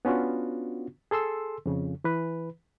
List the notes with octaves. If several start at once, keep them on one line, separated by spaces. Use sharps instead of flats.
B3 C#4 D4 F4 F#4
G#4 A4 C6 E6
F2 C#3
E3 B4